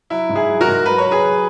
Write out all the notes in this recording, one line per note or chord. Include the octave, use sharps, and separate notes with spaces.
F#3 E4
G#2
E4 G#4
F#3
F#4 A#4
G#2
F#3 B4
C#5
F#3
G#4 B4
F#3